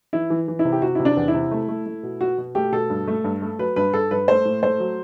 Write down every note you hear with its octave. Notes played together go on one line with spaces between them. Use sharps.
E3 E4
E3
E3
E4
C3
G4
C3 F#4
C3 E4
D4
E2
E4
C3
A3
A3
A3
B2
B2 F#4
B2
A3 G4
B2 A4
G2
A3
G2
A3
F#3 B4
G2 B4
G2 A4
G2 B4
A3 C5
A2
A3 C5
F#3